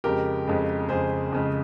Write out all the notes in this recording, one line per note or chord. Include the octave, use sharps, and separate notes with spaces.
F2 C#3 G#3 G4 A#4
F2 C#3 G#3
F2 C#3 G#3 G#4 C5
F2 C#3 G#3